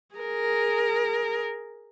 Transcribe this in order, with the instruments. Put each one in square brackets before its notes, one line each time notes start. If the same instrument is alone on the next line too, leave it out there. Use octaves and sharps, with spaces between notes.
[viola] G#4 A#4